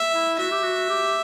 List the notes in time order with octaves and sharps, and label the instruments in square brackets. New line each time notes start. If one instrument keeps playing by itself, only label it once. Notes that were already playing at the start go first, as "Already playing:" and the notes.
Already playing: [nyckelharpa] E5
[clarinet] E4
[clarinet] F#4 [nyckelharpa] E5
[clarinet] G4
F#4
G4